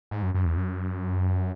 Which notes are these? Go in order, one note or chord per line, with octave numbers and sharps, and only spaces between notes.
G#2
F#2
F#2
E2
F#2